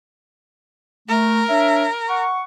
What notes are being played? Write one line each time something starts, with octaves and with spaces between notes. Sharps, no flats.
A3 A#4
D4 C#5 E5
F#5 C#6